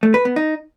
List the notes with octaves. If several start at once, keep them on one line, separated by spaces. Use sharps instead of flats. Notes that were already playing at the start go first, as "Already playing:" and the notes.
A3
B4
B3
D#4